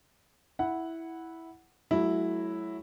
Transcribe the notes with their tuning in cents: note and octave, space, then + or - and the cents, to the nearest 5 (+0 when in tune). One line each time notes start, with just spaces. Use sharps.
E4 -5 F#5 +0
F#3 +0 A3 -45 E4 +0